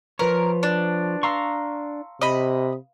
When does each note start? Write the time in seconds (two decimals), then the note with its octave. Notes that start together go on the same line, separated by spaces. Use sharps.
0.19 F3 A#4 B4 C#5
0.63 D4
1.23 F5 A#5 C6 C#6 E6
2.21 C3 D#5 B5